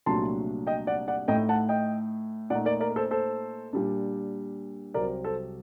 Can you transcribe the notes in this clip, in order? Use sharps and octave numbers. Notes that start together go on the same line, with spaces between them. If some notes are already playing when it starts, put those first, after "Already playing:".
C2 A#2 F#3 A3 D4 A5 C6
D#5 G5
D5 F#5
D5 F#5
A2 A3 D#4 D#5 G5
F#5 A5
D#5 G5
A#2 A3 D#4 D5 F#5
A#4 D5
A#4 D5
A#4
A4 C5
A4 C5
A#2 G3 D4
C2 C3 F#3 C4 A#4 D5
A4 C5